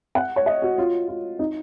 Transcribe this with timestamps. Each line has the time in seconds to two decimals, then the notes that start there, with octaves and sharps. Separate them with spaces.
0.15 F#5
0.36 C#5
0.46 D#5
0.62 F#4
0.78 F4
1.08 F4
1.39 D#4